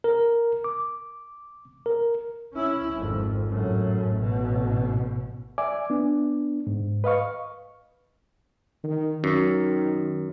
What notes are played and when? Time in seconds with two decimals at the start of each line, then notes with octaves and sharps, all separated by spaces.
0.04 A#4
0.64 D6
1.86 A#4
2.53 C#4 E4
2.96 G#1 F2
3.50 F#2 A2
4.15 A1 B2
5.58 D5 E5 G#5 D6
5.90 B3 D4
6.67 G#2
7.04 B4 D#5 F5 C#6
8.84 D#3
9.24 F#2 D#3